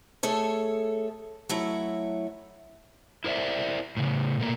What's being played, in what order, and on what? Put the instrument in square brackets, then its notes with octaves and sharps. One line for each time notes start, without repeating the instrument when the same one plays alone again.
[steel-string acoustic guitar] A3 G#4 A4 C#5
F#3 A3 E4 C#5
[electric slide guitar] E4 A#4 C5 D5 E5
A2 C#3
B2 A3 A#3